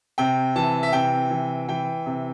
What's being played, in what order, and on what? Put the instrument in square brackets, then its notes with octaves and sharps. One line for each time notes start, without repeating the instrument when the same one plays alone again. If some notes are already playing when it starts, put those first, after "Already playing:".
[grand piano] C3 G5
E3 A5
E5
C3 G5
E3
E3 G5
C3